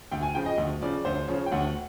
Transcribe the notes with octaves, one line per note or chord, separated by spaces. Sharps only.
D2 G5
G#5
C#3 F3 G5
D#5
D2
C#3 F3 D5
D2 C5
C#3 F3 C#5
G5
D2 F#5